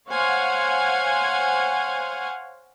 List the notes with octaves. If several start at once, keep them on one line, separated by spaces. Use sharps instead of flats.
C5 C#5 F5 F#5 G#5